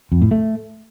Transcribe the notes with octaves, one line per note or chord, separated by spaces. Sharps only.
F2
A2
A3